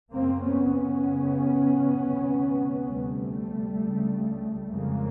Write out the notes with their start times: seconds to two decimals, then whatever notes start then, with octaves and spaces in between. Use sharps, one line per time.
0.11 F#2 C#3 A#3 C4
0.42 B3 C#4
0.73 B3 C#4
1.03 F#2 C#3
1.95 D2 C3
2.86 D2 C3 G3 A3
3.77 C#2 C#3
4.69 F2 C#3 G#3 A#3